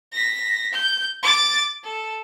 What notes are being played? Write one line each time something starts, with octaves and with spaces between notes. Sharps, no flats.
A#6 B6
G6
D6 A6
A4